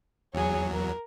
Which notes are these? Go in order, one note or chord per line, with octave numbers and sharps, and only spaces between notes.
E2 F#3 G#4 C#5
A#4